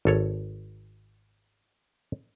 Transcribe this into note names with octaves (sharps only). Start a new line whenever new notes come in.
G#1 A4 C#5